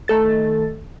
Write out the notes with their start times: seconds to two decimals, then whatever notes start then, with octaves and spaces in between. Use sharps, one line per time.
0.08 D#3 A3 A4 A6